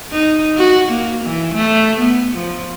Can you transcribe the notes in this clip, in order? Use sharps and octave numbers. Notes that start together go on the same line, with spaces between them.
D#4
F#4
A#3
E3
A3
B3
F3